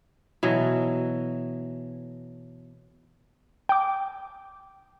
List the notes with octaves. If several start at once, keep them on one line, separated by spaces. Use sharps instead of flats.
B2 E3 F#3
G5 D6